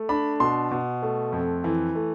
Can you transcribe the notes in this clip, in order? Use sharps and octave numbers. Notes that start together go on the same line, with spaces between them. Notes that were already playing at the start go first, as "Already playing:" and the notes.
Already playing: A3
D4 B5
B2 C6
B2
A3
F2
E3
A3